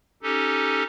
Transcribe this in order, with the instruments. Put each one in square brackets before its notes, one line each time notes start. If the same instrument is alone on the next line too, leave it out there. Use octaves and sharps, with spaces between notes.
[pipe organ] C#4 D#4 G4 A4